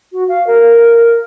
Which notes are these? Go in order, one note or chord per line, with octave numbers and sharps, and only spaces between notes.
F#4
F5
A#4